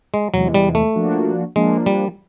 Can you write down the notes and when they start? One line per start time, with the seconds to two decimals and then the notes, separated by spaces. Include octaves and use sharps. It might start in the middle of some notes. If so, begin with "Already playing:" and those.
0.14 G#3
0.34 E2 C3 E3 F#3 G#3
0.54 G3
0.75 A3
0.95 F3 A#3 D4 F#4
1.56 F3 G#3 A#3 D4
1.86 G3